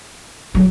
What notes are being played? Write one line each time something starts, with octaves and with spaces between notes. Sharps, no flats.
F#3